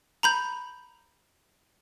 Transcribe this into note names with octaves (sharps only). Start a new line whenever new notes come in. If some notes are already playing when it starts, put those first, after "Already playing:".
A#5 B5 G6